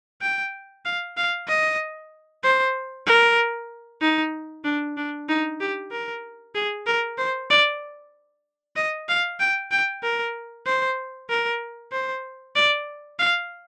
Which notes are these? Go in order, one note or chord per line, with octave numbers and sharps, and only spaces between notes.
G5
F5
F5
D#5
C5
A#4
D#4
D4
D4
D#4
G4
A#4
G#4
A#4
C5
D5
D#5
F5
G5
G5
A#4
C5
A#4
C5
D5
F5